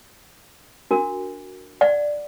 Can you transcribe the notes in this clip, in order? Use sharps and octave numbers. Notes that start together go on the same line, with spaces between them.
D4 F#4 A#4
D5 F#5